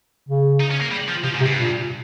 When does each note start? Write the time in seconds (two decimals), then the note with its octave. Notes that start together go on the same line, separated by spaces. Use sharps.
0.29 C#3
0.60 D#4
0.71 C#4
0.81 A#3
0.92 G3
1.09 F3
1.23 C3 F3
1.34 G#2
1.40 C3
1.46 G2
1.56 A#2